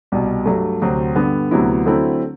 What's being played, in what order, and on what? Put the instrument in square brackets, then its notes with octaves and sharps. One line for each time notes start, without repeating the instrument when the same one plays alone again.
[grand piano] C2 B2 G3
G2 F#3 A3
D2 C3 F#3 C4
G2 D3 G3 B3
D2 C3 F#3 B3 E4
D3 F#3 A3 C4 E4